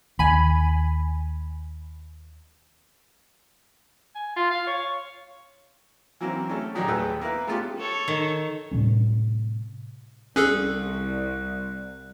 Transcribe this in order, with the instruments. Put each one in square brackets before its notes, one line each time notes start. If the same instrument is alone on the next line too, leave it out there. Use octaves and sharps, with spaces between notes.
[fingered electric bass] D#2 [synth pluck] G#5 B5
[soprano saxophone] G#5
F4
F5
C#5
[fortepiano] E3 F#3 A#3 C4 C#4
A3 C#4
A#2 D#3 F#3 D#4 G4 G#4
D#2 A3 G#4 B4 G5 E6
A#3 E4 B4
G#3 A3 B3 C#4 F4 G4
[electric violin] A4 C#5
[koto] D#3
[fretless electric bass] A2 C3 G3 C#4
[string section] C2 [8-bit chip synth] C#4 G#4 A4 [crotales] F#6